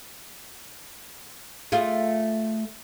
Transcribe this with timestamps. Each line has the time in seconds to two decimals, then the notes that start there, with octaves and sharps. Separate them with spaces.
1.72 A3 F4 G#4